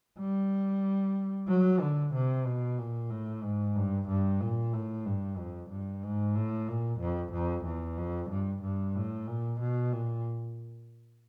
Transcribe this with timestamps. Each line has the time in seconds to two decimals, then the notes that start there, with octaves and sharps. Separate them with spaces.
0.19 G3
1.48 F#3
1.81 D3
2.14 C3
2.46 B2
2.78 A#2
3.11 A2
3.43 G#2
3.76 G2
4.08 G2
4.41 A#2
4.73 A2
5.05 G2
5.38 F2
5.71 G2
6.03 G#2
6.35 A2
6.68 A#2
7.00 F2
7.33 F2
7.65 E2
7.98 F2
8.30 G2
8.63 G2
8.95 A2
9.27 A#2
9.60 B2
9.92 A#2